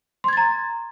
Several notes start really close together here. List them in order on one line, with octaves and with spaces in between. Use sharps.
C6 G#6 A6 A#5